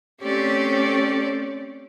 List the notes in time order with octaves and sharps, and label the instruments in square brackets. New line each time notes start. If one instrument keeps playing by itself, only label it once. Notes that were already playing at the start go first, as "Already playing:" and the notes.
[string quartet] A3 C4 C#4 G4 C#5 D5